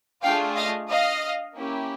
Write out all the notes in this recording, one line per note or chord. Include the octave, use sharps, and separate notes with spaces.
A3 D4 F4 G#4 F5 G5
D#5 F5
D#5 F5
A#3 C#4 E4 G4